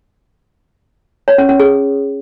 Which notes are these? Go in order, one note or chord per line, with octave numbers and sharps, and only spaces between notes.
C#5
C#4
C#4
G#4